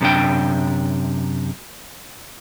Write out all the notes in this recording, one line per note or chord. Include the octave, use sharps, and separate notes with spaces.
F#2 C3 F#3 D4 G5